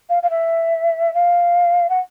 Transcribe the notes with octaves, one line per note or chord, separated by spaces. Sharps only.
F5
F5
E5
F5
F#5